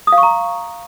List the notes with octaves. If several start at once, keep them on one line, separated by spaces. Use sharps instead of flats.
D#6
F5
C#6
A#5